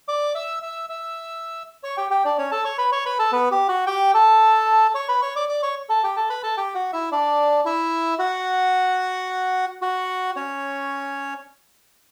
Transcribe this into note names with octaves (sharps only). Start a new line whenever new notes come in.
D5 D6
E5 E6
E5 E6
E5 E6
C#5 C#6
G4 G5
G4 G5
D4 D5
C#4 C#5
A4 A5
C#5 C#6
B4 B5
C#5 C#6
B4 B5
A4 A5
B3 B4
G4
F#4 F#5
G4 G5
A4 A5
C#5 C#6
B4 B5
C#5 C#6
D5 D6
D5 D6
C#5 C#6
A4 A5
G4 G5
A4 A5
B4 B5
A4 A5
G4 G5
F#4 F#5
E4 E5
D4 D5
E4 E5
F#4 F#5
F#4 F#5
C#4 C#5